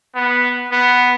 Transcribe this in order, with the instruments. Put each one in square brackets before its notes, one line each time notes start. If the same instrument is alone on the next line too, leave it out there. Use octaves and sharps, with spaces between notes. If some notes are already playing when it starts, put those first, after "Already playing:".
[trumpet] B3
B3